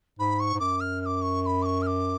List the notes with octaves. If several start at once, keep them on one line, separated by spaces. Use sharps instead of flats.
G#2 B5
C#6
G#2
F#2 D6
F6
F6
D6
C#6
C#6
B5
D6
C#6
F6
D6